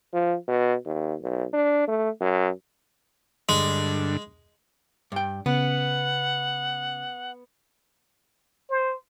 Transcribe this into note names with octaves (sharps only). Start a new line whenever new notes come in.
F3
B2
D#2
B1
D4
A3
F#2
G2 D3 G#3
G2 G5
C#3 B3 F#5
C5